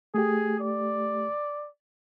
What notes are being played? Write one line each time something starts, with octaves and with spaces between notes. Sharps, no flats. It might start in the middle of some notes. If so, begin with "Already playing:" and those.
A3 G4 G#4
D5